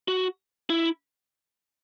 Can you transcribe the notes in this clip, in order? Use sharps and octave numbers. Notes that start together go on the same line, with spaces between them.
F#4
E4